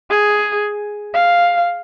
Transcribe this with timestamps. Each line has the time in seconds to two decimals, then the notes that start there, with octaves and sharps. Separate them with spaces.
0.10 G#4
1.14 F5